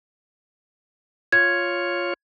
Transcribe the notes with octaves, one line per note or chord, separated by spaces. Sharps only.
F4 C#5 G#6